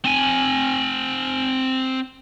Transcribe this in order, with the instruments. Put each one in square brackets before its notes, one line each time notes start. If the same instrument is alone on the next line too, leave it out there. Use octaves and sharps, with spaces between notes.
[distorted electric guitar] C4 G#5